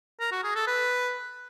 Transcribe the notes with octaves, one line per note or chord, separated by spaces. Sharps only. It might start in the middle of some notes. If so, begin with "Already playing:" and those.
A#4
F#4
G#4
A4
B4